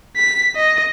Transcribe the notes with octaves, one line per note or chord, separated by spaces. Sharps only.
B6
D#5